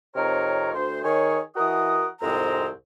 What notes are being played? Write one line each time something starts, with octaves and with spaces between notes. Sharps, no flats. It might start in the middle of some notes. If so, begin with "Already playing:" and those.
F2 C3 D#4 A#4 C#5
D2 C5
D#3 G#4 C#5
E3 F#4 A#4 D#5 F#5 D#6
C2 F2 G#2 G#3 C4 A#5